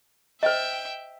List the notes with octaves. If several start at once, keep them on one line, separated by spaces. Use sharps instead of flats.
C5 D#5 E5 G5